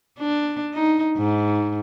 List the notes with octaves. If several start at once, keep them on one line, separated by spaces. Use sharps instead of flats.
D4
D#4
G#2